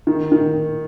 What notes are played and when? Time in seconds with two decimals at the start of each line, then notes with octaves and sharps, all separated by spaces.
0.07 D#3
0.32 D#3